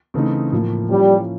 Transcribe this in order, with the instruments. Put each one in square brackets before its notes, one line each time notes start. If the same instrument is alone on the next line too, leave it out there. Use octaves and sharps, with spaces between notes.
[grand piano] C#3 E3 A3 C4 D#4
A2 F3 A#3
[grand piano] F3 A#3 C#4 E4 [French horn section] G3